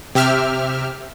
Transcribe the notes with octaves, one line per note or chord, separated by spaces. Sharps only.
C3 G4 E5 F6